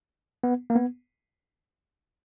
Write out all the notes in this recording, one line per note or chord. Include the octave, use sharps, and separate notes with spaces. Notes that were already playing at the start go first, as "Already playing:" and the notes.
B3
A#3
B3